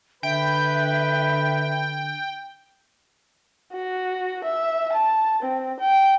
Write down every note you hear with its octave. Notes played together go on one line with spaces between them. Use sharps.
D3 B4 E5 G5
F#4
E5
A5
C4
G5